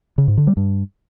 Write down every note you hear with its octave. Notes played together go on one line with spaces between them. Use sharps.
C#3
G#2
D3
G3
G2